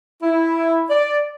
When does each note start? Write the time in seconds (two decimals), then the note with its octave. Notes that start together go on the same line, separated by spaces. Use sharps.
0.23 E4
0.90 D5